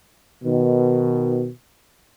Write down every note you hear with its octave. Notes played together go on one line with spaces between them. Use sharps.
B2 D#3